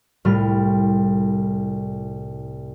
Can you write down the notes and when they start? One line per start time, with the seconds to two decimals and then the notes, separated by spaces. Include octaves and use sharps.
0.25 C2 A2 G3 F4 F6